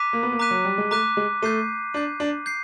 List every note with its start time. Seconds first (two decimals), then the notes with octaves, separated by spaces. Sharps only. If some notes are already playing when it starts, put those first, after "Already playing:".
Already playing: A#5 D6 F#6 B6 D#7
0.13 A#3
0.23 B3
0.32 A#3
0.39 A#5 D6 F#6 B6 D#7
0.51 F#3
0.64 G3
0.78 G#3
0.91 A3 A#5 D6 F#6 B6 D#7
1.17 G#3
1.42 A3 G6 C7 D#7
1.94 D4 G6 C7 D#7
2.20 D4
2.46 G6 C7